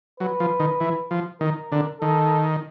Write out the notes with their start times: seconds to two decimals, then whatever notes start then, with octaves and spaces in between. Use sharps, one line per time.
0.20 F#3 B4
0.40 F3
0.60 D#3
0.80 E3
1.11 F3
1.41 D#3 A#4
1.72 D3
2.01 D#3 A4